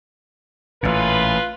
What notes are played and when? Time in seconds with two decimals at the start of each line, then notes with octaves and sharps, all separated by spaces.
0.83 A1 A#2 F4 B4